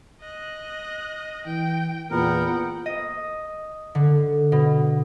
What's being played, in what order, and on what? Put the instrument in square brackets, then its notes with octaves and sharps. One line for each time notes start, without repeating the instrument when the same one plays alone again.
[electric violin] D#5 F#6
[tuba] E3 [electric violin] G5
[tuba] E2 [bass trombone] A#2 [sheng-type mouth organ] B3 A#4 [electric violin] F#5 G5
[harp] D#5
D3
B2